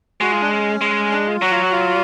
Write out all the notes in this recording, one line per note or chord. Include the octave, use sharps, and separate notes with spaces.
G#3 F#4
F4
D4
C#4
G#3
D4
F4
F#3 F#4
F4
F#4
F4